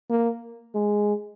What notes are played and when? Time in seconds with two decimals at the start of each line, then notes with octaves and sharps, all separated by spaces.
0.10 A#3
0.75 G#3